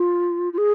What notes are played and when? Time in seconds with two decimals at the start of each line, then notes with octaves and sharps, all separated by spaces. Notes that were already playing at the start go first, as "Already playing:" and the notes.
Already playing: F4
0.53 F4
0.58 G#4